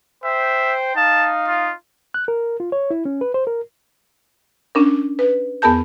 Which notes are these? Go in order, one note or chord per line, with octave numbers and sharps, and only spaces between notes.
C5 E5 G5
D#4 F5 A5
F4
F#6
A#4
F4
C#5
E4
C#4
B4
C5
A#4
C#4 D4 A#4
B4
E2 B3 G#4 A#4 A5 G6